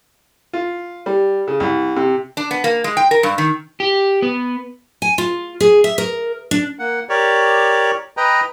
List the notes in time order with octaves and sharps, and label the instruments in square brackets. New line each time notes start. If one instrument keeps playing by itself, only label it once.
[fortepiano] F4
G3
C#3
C2
C3
[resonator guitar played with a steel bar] D4
B3
A#3
G#3
G5
A#4
G2
D#3
[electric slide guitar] G4
B3
[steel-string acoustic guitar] G#5
F4
G#4
E5
A#4
D4
[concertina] A#3 F#5
G4 A#4 C#5 D5
B4 D#5 G5 A#5